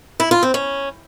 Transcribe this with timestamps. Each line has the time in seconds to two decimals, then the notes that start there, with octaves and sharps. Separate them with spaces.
0.20 E4
0.31 F4
0.43 C4
0.54 C#4